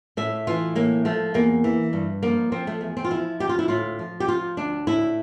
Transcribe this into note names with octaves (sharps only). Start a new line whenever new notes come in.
A2 E5
E3 F4
A2 A#3
F3 A3
E2 A#3
E3
G2
F3 A#3
F3 C4
A3
E2
C4
F4
F3 E4
D2 G4
F4
E4
A2 F4
F3
G4
F3 F4
D2 D4
A2 E4